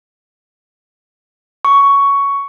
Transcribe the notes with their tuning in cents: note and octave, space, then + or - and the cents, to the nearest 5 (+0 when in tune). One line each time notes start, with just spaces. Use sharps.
C#6 +10